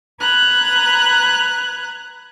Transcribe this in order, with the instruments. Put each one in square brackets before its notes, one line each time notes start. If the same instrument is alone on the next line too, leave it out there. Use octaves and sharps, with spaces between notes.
[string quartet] B4 A#5 F#6 G#6